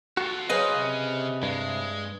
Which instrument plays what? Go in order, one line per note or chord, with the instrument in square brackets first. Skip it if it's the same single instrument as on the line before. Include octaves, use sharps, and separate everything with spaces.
[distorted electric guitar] F4 A4 [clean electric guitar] F#4
[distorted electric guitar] C#3 C#4 [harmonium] F#3 C5 F5 [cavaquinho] G#4 B4 [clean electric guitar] D#5
[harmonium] C3
[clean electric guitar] G2 [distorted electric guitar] G#3